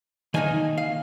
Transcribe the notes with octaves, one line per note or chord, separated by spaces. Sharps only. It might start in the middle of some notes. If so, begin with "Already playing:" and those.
D#3 A#3 D#4 G#5
F5